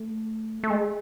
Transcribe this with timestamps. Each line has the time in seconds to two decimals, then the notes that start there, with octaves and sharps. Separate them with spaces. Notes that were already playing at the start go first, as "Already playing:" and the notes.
Already playing: A3
0.63 A3
0.70 G#3